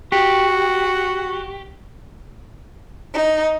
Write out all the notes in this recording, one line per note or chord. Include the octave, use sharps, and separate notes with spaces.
F#4 G4
D#4